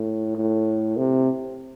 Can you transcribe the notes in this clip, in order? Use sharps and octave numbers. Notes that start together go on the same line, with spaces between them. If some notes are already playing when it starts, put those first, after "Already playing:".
Already playing: A2
A2
C3